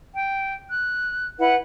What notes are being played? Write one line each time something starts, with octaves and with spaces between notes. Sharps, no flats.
G5
F#6
E4 B4 F#5